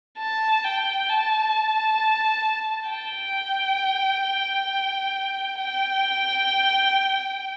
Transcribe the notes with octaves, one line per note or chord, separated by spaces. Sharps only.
A5
G5
A5
G5
G5